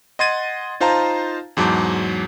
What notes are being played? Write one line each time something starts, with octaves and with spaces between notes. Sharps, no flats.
D#5 F#5 C6 G#6 A6 D#7
D#4 F4 C5 F5 A5 A#5
E2 G#2 F#3 A5 D6 G6